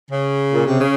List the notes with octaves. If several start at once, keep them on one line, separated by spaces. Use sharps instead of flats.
C#3
A#2
C3
C#3